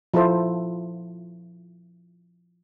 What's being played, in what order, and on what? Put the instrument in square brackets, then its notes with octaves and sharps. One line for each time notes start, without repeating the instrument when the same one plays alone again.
[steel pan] F3 E4 F4 A4 C5